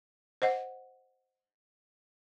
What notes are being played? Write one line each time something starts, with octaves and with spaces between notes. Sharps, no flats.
C5 D#5 F#5